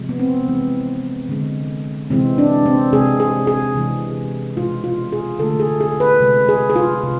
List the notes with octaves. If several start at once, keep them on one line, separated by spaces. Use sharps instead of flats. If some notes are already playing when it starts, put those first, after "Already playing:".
Already playing: C3 F3 G#3
B3
C4
C3 E3 G#3
D3 G#3
C3 E3 G#3 C4
D4
C4
C3 G#3 G#4
G#4
G#4
C3 E3 G#3
B2 G#3 F4
F4
G#4
D3 A3 A4
G#4
G#4
B4
C3 G#3
G#4
G#4
F4
C3